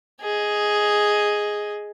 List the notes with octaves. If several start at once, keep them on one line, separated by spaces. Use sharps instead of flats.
G#4 D#5